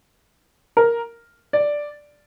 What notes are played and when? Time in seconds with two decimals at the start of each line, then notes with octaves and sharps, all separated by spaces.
0.77 A#4
1.53 D5